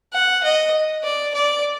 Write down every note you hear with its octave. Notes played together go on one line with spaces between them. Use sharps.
F#5
D#5
D5
D5